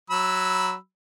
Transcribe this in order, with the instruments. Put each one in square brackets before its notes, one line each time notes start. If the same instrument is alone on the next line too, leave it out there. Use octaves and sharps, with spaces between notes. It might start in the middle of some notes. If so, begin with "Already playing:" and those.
[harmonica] F#3 B5 E6